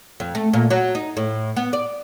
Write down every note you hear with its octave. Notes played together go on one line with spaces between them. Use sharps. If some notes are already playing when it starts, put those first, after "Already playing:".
F2
A3
A#2
F#3
D#4
A2
B3
D5